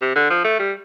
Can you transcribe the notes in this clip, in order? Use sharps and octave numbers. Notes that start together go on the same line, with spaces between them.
C3
D3
F3
A3
G3